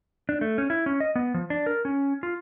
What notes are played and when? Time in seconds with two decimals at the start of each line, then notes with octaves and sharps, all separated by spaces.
0.29 D4
0.41 A3
0.58 C#4
0.70 E4
0.86 C#4
1.00 D#5
1.16 B3
1.34 F3
1.50 D4
1.66 A#4
1.85 C#4
2.23 F4